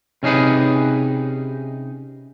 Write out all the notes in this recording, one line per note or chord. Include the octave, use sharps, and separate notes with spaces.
C3 C#4 D#4 G#4 B4